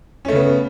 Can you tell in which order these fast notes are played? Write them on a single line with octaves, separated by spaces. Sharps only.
C#4 A3 C#3 B3